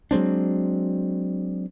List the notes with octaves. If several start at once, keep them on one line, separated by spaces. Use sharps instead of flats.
F#3 G#3 C4 D4